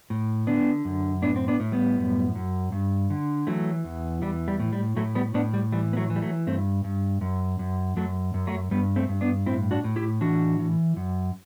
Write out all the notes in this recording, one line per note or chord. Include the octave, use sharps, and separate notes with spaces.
A2
D3 B3 D4
F#2
A2 B3 D4
C4
B3 D4
A2
G3 B3
F#2
F#2
G2
D3
E3 F#3 A3
E2
E3 G3
G3
A2
G3
A2 F#3 A3
G3 B3
A2 B3 D4
G3
E3 G3
B3
F#3 A3
E3
G3
F#3 A3
G2 A3 C4
G2
F#2
F#2
F#2 F#3 A3
F#2
F#3 A3
G2 G3 B3
A3 C4
G2
B3 D4
A2 C4 E4
D4 F#4
A2
E4 G4
E3 D4 F#4
E3
F#2